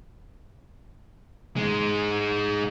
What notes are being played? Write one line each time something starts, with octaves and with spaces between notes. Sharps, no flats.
G#2 G#3